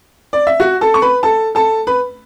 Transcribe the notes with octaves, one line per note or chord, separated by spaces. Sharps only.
D5
E5
F#4 F#5
A4 A5
C#6
B4 B5
A4 A5
A4 A5
B4 B5